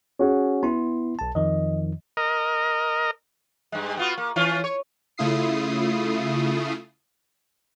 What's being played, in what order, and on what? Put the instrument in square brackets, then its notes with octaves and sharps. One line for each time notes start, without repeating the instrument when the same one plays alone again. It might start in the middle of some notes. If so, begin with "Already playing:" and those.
[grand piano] C#4 F#4 G#4
[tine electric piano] B3 E4 [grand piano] C6
[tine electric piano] B1 A5
[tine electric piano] F2 D#3 F3 [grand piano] D#5
[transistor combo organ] A#4 D#5
[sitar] G2 G#3
B3 F4 F#4
A#3
E3 C#4 F4
C#5
[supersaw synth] C#3 A3 E4 F4 D#6 C7